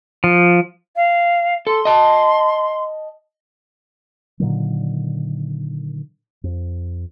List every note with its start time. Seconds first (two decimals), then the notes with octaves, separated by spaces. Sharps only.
0.24 F3
0.96 F5
1.67 A4 C6
1.85 D#5 A5
4.40 A#2 D3 D#3 F#3
6.44 F2